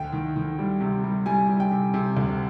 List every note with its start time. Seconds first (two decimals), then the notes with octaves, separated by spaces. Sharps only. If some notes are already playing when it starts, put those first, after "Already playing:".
Already playing: D2 G5
0.12 D#3
0.36 D#3
0.59 G3
0.81 C3
1.04 G3
1.26 G3 G#5
1.49 G3
1.60 G5
1.72 C3
1.94 C3
2.17 D2